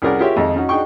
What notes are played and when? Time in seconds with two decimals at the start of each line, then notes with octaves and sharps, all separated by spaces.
0.02 C2 C#4 G#4 A#4 D5 F#5
0.20 F4 G4 G#4 A#4 C#5 E5
0.36 F2 D#3 G#3 D#4
0.55 C#4 D#4 F#4
0.69 D4 D#4 F#4 G#4 G5 C#6